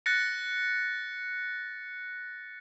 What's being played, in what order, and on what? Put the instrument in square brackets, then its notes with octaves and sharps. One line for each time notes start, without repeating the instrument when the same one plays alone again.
[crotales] F#6 A6 A#6 C#7